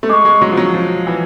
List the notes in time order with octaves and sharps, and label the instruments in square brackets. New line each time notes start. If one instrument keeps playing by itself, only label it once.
[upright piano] A3
[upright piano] G#3 [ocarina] C#6 D6
[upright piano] G#3
F#3
F3
F#3
F3
E3